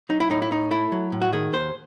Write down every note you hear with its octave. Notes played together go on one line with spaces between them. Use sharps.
F#3 D#4
E4
A2 D#4
E4
A2 D#4
A3 E4
F#3
A2
F#4
D#3 G#4
D#2 C5